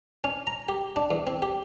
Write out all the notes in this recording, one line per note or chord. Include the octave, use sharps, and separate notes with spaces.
C#4
A#5
G4
D4
E2
C4
G4